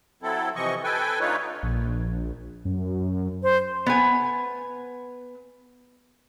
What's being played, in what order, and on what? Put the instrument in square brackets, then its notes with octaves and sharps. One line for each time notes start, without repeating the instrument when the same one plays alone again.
[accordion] F#3 C4 E4 A4
C3 E3 F3 D#5 C#6
A4 B4 G5 G#5
D3 A3 D#4 F4 B4 C#5
[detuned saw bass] A#1
F#2
[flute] C5
[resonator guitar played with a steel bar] B3 G#5